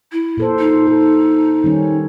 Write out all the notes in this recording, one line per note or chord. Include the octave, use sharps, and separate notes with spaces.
E4
A#2 A4 C5
D#4
A4
D#3 G3 C#4